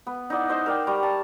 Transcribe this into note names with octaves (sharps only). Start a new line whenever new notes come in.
B3
D#4 E4 D5 F#5
C5 D#5
A#4 D5 G5
G3 A#5 C#6
A5